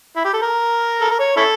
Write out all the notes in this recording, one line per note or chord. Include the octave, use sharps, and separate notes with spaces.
E4
G4
A4
A#4
A4
A#4
C#5
C#4 E4 A4